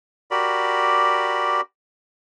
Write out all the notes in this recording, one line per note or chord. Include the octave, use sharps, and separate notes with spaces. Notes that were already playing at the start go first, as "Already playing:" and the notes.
F#4 G4 A#4 D5 B5